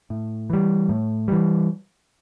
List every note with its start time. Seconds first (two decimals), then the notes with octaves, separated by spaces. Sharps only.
0.10 A2
0.50 E3 G3
0.89 A2
1.28 E3 G3